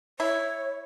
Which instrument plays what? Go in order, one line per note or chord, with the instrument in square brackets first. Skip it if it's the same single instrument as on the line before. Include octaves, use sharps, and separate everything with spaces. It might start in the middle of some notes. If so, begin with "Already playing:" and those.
[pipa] E4 [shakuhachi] C#5